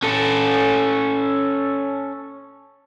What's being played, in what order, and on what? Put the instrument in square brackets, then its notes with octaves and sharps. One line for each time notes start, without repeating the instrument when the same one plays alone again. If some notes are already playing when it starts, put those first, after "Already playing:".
[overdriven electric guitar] C#4 A4